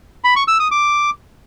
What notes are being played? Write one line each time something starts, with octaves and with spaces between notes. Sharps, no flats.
B5
C#6
E6
D#6
D6